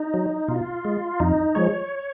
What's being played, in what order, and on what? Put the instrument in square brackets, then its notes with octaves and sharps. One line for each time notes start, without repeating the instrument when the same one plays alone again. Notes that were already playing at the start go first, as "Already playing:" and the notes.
Already playing: [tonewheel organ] D#4
F#3
B2 F4
G#3
F2 D#4
F3 G#3 C#5